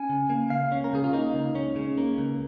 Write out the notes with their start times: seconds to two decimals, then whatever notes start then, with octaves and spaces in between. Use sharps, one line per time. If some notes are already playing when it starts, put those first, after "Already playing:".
Already playing: C#4 G#5
0.09 C#3
0.30 A#3
0.50 C#2 F5
0.72 C#4
0.84 A#4
0.93 C#3 G#4
1.04 F4
1.13 A#3 D#4
1.35 C#2
1.55 C#4
1.76 C#3
1.98 A#3
2.18 C#2